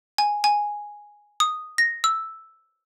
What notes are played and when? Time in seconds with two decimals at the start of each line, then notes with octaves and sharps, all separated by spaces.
0.18 G#5
0.44 G#5
1.40 D#6
1.78 A#6
2.04 E6